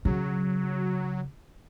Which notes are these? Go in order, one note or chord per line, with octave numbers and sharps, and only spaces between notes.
C#3 F#3